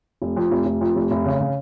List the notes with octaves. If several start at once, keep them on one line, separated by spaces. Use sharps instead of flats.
F1
F2
F1
F1
F2
F1
F1
C#3
C#3